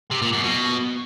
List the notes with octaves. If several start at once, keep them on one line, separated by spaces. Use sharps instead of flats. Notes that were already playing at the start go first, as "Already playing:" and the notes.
C3
A#2
F#2
B2